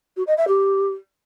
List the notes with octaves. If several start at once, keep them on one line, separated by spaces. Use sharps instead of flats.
F#4
D#5
E5
G4